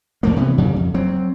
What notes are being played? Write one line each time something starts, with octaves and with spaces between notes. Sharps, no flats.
E2 A3 A#3
C3 E3 B3
F2 C#3 F#3 G3
F2
F#3 C4